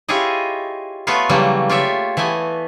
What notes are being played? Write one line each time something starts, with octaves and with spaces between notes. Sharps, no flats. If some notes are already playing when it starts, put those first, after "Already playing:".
E4 F4 G4 G#4 C#5 D#5
A3 B3 F4 B4 C#5 F5
C#3 E3 F#3 G3 A3 A#3
F4 G4 C#5 D5 E5
E3 A3 B3 G#5